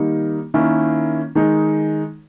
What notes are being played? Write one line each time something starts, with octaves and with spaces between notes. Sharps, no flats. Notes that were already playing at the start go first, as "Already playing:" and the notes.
Already playing: D#3 G3 A#3 D#4
D#3 A#3 C#4 E4
D#3 G#3 D#4